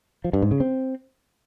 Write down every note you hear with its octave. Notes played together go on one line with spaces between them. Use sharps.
F3
G2
G#2
C#3
C4